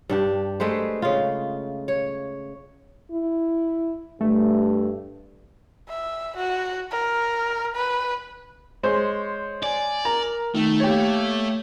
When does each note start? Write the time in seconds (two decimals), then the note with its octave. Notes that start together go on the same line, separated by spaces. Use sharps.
0.09 G2 D4 G4
0.60 G#3 A3 B4 C5
1.02 C#3 F4
1.88 C#5
3.12 E4
4.21 G2 A3
5.88 E5
6.37 F#4
6.91 A#4
7.76 B4
8.83 G#3 C5 C#5
9.63 D5 G#5
10.05 A#4 A#5
10.55 D#3 A3
10.80 A#3 G4 C#5